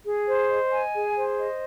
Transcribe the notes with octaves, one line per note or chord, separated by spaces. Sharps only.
G#4
C5
D#5
G#5
G#4
C5
D#5